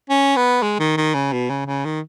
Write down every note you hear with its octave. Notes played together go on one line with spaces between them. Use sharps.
C#4
B3
G#3
D#3
D#3
C#3
B2
C#3
C#3
D#3